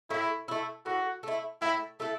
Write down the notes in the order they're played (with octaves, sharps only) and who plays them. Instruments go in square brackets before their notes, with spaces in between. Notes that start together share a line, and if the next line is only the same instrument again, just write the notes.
[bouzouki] A2 [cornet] E4
[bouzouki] A3 E4
[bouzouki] A2 [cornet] F#4
[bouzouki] A3 E4
[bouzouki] A2 [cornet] E4
[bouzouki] A3 E4 A4